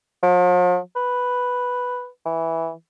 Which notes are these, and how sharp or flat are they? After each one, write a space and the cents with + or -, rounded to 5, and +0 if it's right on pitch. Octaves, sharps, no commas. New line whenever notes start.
F3 +45
B4 +0
E3 -5